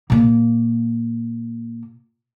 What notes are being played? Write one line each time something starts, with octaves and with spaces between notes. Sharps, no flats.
A#2 A#3